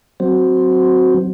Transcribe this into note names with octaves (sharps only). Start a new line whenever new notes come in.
F#3 C4